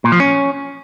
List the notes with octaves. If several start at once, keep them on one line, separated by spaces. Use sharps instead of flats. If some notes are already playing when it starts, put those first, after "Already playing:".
A#2
F3
C#4